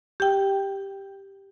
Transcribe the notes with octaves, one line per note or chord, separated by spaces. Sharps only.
G4 G5